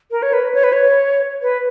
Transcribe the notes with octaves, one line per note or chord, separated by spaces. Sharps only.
A#4
C#5
B4
C#5
B4
C#5
B4